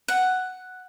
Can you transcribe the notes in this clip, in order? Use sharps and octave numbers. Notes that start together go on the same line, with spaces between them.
F#5